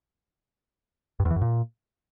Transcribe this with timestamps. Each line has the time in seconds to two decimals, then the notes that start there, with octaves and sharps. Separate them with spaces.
1.20 G2
1.25 E2
1.31 E3
1.36 F#2
1.41 A#2